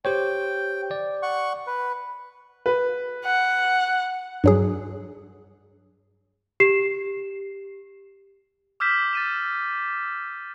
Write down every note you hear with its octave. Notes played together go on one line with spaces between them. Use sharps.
G4 C5 C#5 G5
D5
F#5 C#6
B4
B4
F#5
G2 F#3 G#4
G4 C7 E7
D6 E6 F6 G6 B6 E7
A6 D#7 E7